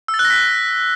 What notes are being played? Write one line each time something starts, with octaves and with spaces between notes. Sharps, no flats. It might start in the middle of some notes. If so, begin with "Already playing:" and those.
E6
A6
F#6
A#6
B6